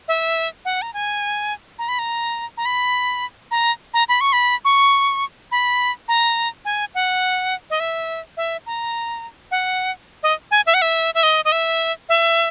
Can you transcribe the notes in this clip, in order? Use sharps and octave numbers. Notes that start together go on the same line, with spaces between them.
E5
F#5
A#5
G#5
A#5
B5
A#5
A#5
B5
A#5
A#5
B5
C#6
B5
C#6
B5
A#5
G#5
F#5
D#5
E5
E5
A#5
F#5
D#5
G#5
E5
F#5
E5
E5
D#5
D#5
E5
E5